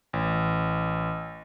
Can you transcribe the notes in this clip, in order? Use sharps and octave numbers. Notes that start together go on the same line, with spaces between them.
A1